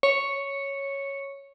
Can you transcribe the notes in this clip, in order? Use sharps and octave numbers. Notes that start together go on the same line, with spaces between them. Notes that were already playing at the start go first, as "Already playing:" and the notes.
C#5